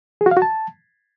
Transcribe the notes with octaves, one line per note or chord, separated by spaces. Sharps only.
G#4
F#4
F5
F#4
A5